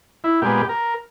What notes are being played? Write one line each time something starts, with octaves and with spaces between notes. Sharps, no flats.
E4
A#2 G#3 B3 G4
A#4